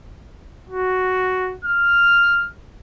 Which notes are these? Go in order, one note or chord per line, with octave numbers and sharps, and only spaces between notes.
F#4
F6